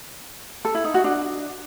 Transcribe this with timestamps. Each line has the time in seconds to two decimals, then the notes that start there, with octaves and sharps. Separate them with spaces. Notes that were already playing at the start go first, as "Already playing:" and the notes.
0.65 A4
0.75 E4
0.84 D#4
0.94 F#4
1.04 D4